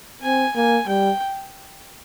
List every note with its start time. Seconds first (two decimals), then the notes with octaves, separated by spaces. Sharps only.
0.22 C4 G#5
0.55 A#3 G#5
0.88 G3 G5